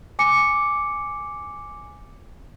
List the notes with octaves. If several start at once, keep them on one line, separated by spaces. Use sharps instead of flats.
G#5 D6 C#7